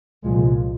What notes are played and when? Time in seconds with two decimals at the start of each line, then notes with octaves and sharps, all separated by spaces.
0.23 C2 A#2 F3 G#3